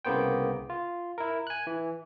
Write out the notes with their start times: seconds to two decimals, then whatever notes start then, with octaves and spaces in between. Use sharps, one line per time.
0.05 C2 C#3 A#3 B3 C5 G5
0.70 F4
1.18 E4 A#4
1.47 G#5 F#6
1.67 E3